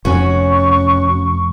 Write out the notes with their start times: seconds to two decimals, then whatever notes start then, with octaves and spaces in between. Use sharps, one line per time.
0.05 F1 C#4 F#4 G#5 C#6